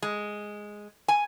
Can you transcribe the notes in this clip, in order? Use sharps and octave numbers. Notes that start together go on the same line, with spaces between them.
G#3
G#5